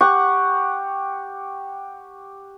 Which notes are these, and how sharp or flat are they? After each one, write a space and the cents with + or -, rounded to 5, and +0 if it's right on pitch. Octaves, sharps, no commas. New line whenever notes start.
G4 +5 F#5 +0 C#6 +0